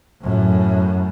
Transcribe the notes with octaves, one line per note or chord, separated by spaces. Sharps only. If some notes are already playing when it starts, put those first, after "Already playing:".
F#2 A2